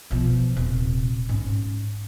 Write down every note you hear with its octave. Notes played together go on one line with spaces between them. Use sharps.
B2 F3
D#1 C3
G#2 C#4